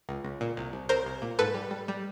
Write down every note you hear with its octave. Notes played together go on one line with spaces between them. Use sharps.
C#2
C#2
A#2
C2
C2
C2 A#4 C5
C2
A#2
G#2 A4 B4
G3
G3
G3